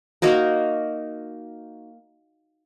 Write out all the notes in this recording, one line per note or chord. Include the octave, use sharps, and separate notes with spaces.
A#3 D#4 F#4 A#4